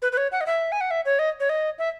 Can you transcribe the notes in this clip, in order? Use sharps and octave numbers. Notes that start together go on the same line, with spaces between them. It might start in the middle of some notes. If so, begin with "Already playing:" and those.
B4
B4
C#5
F#5
D#5
E5
G#5
F#5
E5
C#5
D#5
C#5
D#5
E5